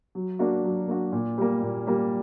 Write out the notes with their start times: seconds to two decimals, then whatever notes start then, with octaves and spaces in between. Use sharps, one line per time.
0.15 F#3
0.39 A#3 D4 F#4
0.64 F#3
0.88 A#3 D4 F#4
1.12 A#2
1.38 G3 A#3
1.63 A#2
1.87 G3 A#3